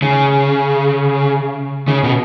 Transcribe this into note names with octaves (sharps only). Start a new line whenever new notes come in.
C#3
C#3
B2